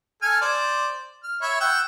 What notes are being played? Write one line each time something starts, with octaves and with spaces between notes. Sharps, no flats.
A4 G#5 F6
C5 D5
F6
C#5 E5 B5
F#5 G5 E6